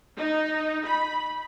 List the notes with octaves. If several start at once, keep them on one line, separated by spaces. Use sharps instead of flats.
D#4
B5